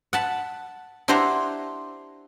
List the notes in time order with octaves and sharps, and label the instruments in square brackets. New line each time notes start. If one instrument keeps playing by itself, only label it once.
[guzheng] F#5 A5 B5
D4 E4 G4 C5 F#5 A#5